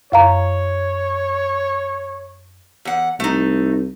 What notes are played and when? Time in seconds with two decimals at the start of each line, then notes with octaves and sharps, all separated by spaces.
0.12 F#2 C#5 F5 A#5
2.85 E2 F#5
3.20 C2 A3 D#4